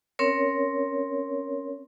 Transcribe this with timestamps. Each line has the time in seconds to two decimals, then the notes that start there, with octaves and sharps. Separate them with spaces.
0.19 C4 C#4 A#4 C#5